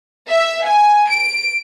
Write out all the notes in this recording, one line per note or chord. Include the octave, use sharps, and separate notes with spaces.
E5
G#5
D7